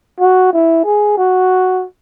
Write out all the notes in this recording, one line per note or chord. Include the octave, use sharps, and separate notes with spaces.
F#4
E4
G#4
F#4